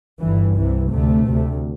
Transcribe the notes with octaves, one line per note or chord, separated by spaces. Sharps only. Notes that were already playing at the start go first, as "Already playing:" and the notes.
G1 G2 E3
C2 C3 E3
D2 C3 A3
D2 C3